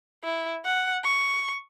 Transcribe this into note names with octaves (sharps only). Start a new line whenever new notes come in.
E4
F#5
C#6